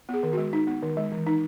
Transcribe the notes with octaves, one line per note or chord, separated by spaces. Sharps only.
B3 G#4
D#3
F#4
G#3
D#4
B3
D#3
G#3
E3
D#4